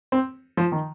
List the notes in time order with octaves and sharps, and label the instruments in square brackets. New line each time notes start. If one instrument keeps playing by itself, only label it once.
[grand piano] C4
F3
D#3